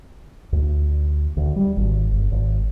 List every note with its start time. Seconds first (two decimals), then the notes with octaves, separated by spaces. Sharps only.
0.52 D2
1.37 D2
1.56 G3
1.77 G#1
2.12 G1
2.32 G#1